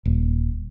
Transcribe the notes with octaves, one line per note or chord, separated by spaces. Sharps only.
D#1